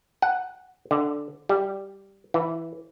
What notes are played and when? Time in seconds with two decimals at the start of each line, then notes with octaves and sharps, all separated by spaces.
0.22 F#5
0.91 D3
1.49 G3
2.34 E3